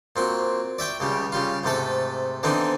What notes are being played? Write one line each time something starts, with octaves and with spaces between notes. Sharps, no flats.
A#2 C4 F#4
D5 E5 G5 C#6
C#2 C#3 G3
C#3 G3 F4
G#2 C3 A3 A4
D3 E3 B3 C4 D4 D#4